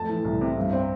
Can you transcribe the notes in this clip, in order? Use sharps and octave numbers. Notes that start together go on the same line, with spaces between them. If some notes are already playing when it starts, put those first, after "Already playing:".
Already playing: F2 A3 A5
E3
C2
C3
G2
C4